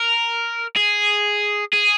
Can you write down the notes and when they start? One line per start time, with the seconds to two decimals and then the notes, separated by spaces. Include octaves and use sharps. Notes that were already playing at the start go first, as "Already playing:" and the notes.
Already playing: A#4
0.76 G#4
1.73 G#4